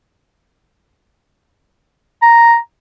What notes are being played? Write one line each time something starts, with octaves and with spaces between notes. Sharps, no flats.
A#5